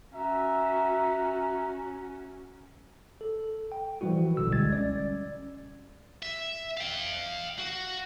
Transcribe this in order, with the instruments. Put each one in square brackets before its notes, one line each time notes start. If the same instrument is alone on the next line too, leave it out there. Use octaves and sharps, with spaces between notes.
[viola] C#4 F#4 [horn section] E5 [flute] A#5
[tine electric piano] A4
G5
E3 F3 G3 E4 F#4
A1 B2 D3 E6
G#1 C#2 G3 G#3 G#6 A6
C#4 D5
[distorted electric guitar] E5
F5 G5
F#4